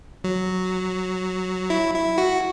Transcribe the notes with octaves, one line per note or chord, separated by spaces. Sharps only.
F#3
E4
E4
F#4